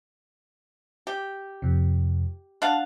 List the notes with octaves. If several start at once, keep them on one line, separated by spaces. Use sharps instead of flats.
G4
F2 C3
D4 F5 F#5 A5